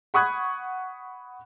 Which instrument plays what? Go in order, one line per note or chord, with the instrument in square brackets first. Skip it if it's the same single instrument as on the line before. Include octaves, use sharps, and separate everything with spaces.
[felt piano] F#5 B5 C#6 D#6 F#6 G#6